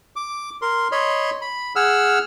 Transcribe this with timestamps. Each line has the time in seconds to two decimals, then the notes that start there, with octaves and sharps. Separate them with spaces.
0.16 D6
0.62 A#4 C6
0.92 C#5 D#5 B5 C6
1.42 B5
1.76 G#4 F#5 E6 F6